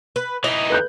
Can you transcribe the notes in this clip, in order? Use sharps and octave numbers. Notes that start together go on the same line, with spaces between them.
B4
E3 D#4 D#5
B4 F#6 G6